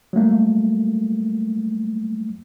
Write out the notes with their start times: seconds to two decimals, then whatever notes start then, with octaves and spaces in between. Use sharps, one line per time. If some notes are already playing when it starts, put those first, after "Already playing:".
0.13 F#3 G3 A3 A#3